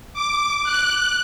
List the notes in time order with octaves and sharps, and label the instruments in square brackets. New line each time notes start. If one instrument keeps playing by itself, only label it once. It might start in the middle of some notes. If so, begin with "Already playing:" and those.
[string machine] D6
F#6